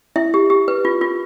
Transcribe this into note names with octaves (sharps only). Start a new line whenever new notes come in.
E4 E5
G4
G4
B4
F4
F4